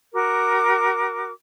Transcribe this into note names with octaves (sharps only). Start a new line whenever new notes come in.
F#4 A#4 D6